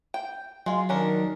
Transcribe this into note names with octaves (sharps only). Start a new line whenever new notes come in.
G5
F#3 G#3 F4
D#3 C#4 D4 A#4